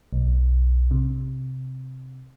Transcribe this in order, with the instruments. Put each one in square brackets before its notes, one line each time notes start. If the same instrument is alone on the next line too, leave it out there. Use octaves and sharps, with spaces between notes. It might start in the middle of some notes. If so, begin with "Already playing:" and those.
[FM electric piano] B1
C3